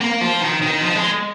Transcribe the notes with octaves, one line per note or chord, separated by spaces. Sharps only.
A#3
F3
D#3
D#3
F3
G#3